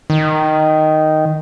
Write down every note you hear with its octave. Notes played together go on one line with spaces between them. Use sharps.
D#3